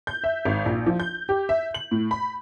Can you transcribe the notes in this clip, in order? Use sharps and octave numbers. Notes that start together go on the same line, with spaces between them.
G6
E5
G#1
A#1
F3
G6
G4
E5
F#7
A2
B5